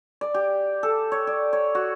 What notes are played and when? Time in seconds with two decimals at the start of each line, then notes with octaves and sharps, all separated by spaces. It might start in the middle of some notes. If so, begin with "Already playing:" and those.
0.21 D5
0.34 G4
0.83 A4
1.12 C#5
1.27 D5
1.53 C#5
1.75 F#4